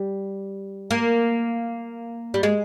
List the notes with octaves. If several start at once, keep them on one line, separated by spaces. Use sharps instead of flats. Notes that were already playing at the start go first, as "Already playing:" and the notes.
Already playing: G3
A#3
G3
G#3